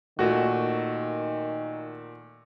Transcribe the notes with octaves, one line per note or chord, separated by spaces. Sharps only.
A#2 D#3 A3 F#4